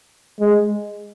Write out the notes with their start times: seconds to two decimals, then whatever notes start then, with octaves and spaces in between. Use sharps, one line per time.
0.40 G#3